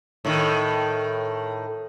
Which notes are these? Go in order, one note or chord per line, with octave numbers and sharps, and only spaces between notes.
A2 D#3